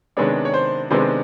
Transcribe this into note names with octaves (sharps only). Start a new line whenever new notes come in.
C3 D#3 G#3 B3 D4 C#5
C#5
C5
C3 D#3 G#3 B3 D4 C5